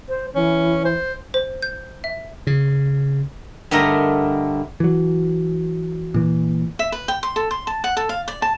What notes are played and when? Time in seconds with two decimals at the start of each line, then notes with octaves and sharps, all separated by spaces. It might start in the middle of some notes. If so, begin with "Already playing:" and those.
0.09 C5
0.35 E3 C#4
0.85 C5
1.34 C5
1.62 G6
2.04 E5
2.47 C#3
3.71 G2 D3 A3 A#4 D#5 A#5
4.80 E3 F#3
6.14 A#2 E3
6.79 E5
6.92 B4
7.08 G5
7.23 C6
7.36 A4
7.51 C6
7.67 A5
7.84 F#5
7.97 A4
8.09 F5
8.28 D5
8.42 A5